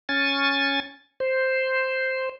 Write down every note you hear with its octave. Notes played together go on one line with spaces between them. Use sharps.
C#4 G#5 A6
C5